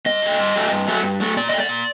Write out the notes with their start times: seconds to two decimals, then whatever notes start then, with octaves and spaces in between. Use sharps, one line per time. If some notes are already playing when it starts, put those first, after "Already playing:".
0.06 G2 D#5
0.22 F#3 A3
0.39 G2
0.55 F#3 A3
0.72 G2
0.88 F#3 A3
1.03 G2
1.20 F#3 A3
1.37 A#2 D5
1.48 A3 D#5
1.60 D5
1.69 A#2